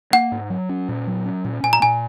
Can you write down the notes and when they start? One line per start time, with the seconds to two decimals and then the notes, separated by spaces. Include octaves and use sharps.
0.13 A#3 F#5
0.32 G#2
0.50 F#3
0.69 C#4
0.89 A#2
1.07 F#3
1.25 C#4
1.45 A#2
1.63 A#2 G#5
1.73 A#5
1.82 A#2 G#5